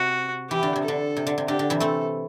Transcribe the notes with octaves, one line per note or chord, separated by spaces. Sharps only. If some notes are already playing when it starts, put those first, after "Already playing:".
Already playing: C3 F#4
E3 G4
D3
C3
D3 A4
C3
D3
C3
D3 G4
D3
C3 E3
A3 C4 A4